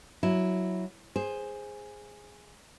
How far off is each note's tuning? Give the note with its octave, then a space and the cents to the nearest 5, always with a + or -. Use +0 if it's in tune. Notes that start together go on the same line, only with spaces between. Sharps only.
F#3 +0 E4 -5
G#4 -5 C5 +10